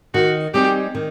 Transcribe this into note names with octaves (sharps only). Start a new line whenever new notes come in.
D#3 F#4
G3 C4 D#4 G4 G#4
D#3